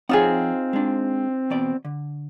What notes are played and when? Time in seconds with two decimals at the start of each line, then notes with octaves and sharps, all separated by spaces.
0.09 F2 C4 D#4 F4 G#4 C#5 F#5
0.73 G#3 D4
1.50 E2 B2 D5
1.85 D3